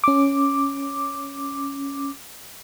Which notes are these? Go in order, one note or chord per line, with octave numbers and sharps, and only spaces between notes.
C#4 D6